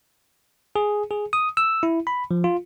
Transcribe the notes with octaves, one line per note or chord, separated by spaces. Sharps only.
G#4
G#4
D#6
E6
E4
B5
F3
F4